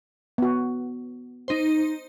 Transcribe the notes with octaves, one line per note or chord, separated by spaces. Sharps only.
B3 F#4
D#4 C5